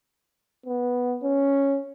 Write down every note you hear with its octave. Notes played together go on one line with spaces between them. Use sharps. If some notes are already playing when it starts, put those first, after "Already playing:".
B3
C#4